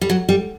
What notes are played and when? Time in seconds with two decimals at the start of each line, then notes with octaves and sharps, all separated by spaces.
0.01 G3
0.10 F#3
0.29 G3